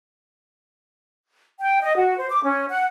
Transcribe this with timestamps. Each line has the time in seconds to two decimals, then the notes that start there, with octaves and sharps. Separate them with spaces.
1.60 G5
1.82 D#5
1.96 F#4
2.18 C5
2.30 D6
2.44 C#4
2.69 F#5